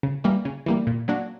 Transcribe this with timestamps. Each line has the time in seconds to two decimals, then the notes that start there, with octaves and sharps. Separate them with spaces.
0.03 C#3
0.24 E3 G3 A#3
0.45 C#3
0.66 E3 G3 A#3
0.87 A#2
1.08 F#3 A#3 D4 F#4